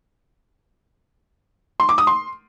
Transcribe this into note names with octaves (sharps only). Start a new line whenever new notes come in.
C6
D6
D#6
C6